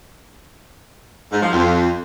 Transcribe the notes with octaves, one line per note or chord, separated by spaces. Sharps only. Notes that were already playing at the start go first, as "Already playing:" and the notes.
G#2
F3
F2